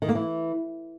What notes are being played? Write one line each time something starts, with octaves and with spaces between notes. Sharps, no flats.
D#3
A#3
E3